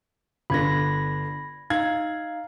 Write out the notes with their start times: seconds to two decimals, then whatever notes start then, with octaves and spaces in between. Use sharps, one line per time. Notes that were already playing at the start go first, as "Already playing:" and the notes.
0.50 G1 D3 B5 G#6 A#6
1.70 D#4 F5 G#6